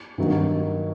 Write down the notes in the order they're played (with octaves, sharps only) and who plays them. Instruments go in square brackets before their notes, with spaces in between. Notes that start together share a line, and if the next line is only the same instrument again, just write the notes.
[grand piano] G2 D#3 F#3 A#3 D#4